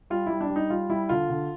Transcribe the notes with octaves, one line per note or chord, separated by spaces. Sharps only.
G3 F4
G3 E4
D4
G3
D#4
G3 F4
G3 E4
D3 F4
D3